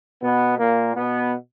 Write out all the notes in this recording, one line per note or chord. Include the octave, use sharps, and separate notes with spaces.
B2 B3
A#2 A#3
B2 B3